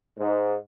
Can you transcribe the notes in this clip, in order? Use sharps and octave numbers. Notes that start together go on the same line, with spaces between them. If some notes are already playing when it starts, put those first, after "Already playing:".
G#2